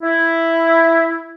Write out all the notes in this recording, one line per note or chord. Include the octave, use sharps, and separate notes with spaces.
E4